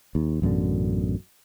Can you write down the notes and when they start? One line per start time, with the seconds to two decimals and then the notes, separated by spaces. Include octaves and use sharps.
0.15 D#2
0.42 A1 F#2 B2 D3